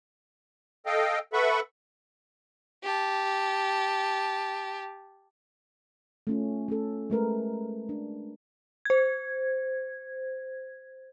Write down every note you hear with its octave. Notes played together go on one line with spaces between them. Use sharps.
A4 D#5 F5 G5
A4 B4 E5 F#5 B5 C#6
G4 A5
A3 C#4 F4
A3 C#4 A4
G#3 A3 A#4 B4
D4
C5 G#6